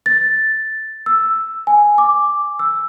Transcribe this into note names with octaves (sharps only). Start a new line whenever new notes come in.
A6
E6
G#5
D6
E6